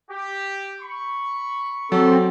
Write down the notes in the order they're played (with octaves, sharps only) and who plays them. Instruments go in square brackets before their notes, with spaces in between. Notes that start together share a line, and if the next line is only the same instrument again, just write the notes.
[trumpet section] G4
B5 C#6
[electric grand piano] F#3 [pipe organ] C4 [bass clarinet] A4